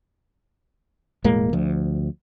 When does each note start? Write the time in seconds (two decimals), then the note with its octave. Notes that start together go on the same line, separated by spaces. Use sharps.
1.24 E1 A2 G#3 A#3
1.53 D2 F3